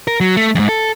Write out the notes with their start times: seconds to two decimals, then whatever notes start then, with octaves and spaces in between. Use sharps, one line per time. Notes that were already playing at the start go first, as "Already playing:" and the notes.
0.08 A#4
0.20 F#3
0.37 A3
0.55 F2 G#2
0.69 A4